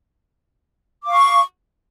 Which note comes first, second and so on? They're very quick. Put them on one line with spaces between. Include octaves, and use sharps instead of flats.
D6 F5 C#6